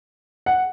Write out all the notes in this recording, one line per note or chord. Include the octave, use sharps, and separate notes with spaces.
F#5